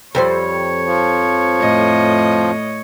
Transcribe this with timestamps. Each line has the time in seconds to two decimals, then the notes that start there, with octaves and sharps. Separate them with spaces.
0.15 F2 G3 C5 C#5
0.86 F3
1.60 A2 D#5